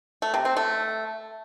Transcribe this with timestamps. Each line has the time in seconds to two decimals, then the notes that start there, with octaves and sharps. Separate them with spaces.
0.22 A3
0.34 C3
0.45 C4
0.57 A3